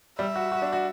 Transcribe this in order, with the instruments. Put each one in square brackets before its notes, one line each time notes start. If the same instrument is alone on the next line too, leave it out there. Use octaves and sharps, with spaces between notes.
[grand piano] G3 [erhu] E5
[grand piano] F#4
F#4
D4
F#4